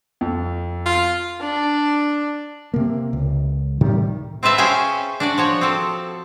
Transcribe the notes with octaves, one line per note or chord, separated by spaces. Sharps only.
F2
F4
D4
C3 A#3
C#2
A2 C3 D#3 G3
C4 F4 B4 E5 A5
C#4 G#4 C5 G5 G#5
D4 F#4 D5
F3 F#4 C#5
C4 A4